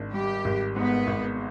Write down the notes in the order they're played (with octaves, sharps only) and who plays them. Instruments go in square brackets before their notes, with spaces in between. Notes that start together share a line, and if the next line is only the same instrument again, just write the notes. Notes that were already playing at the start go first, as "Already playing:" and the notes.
Already playing: [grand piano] G#1 D4
[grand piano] G3 [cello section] G4
[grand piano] G#1
[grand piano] G#2 [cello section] B3
[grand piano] G#1